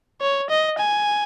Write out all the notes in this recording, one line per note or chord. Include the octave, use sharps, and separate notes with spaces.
C#5
D#5
G#5